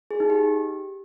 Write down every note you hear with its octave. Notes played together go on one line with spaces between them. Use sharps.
G#4
D#4
G4